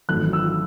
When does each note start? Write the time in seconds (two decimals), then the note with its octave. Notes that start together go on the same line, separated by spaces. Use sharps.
0.09 G#1 F#2 E3 A3 F#6
0.33 E6